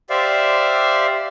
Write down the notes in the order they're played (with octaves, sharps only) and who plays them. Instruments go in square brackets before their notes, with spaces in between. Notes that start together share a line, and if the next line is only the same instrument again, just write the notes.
[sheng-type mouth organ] G4 C5 D5 E5 F5